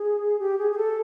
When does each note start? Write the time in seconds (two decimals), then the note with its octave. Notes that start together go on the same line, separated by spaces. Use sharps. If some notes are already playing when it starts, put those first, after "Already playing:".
Already playing: G#4
0.39 G4
0.58 G#4
0.72 G#4
0.77 A4